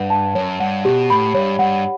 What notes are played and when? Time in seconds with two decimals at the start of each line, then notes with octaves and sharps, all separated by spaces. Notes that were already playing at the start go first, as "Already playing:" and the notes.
Already playing: G2 B4 F#5
0.10 A5
0.35 F#2 C#5
0.60 G2 F#5
0.84 B2 G4
1.09 A2 B5
1.34 G2 C#5
1.59 G2 F#5